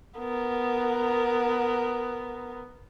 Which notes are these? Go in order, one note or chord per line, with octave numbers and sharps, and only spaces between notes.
B3 A#4